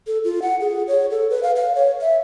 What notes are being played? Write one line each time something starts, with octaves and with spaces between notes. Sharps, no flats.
A4
F4
F#5
G#4
C#5
A4
B4
F5
F5
C#5
E5